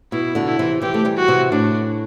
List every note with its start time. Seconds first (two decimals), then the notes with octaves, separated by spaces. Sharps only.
0.12 B2 E4
0.35 B2 D3
0.47 E4
0.59 C3 E3
0.82 C3 E3 G4
0.94 A3
1.05 E3 G3
1.17 F#4
1.28 C3 E3
1.52 A2 D4